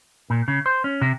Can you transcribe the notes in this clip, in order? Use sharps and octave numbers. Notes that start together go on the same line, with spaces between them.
A#2
C#3
C5
C#4
C3